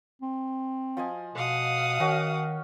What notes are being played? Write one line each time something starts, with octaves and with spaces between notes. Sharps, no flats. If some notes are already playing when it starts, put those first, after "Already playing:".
C4
F3 D#5 G#5
B2 F5 F#5 D#6
D#3 C#4 F#4 D#5